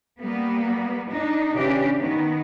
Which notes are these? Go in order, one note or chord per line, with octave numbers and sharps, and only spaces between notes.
G3 A#3 B3
D4 D#4
C#3 E3 D4 G4
D#3 B3